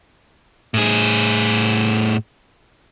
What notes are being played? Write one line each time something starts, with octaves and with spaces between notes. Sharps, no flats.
A2 G#4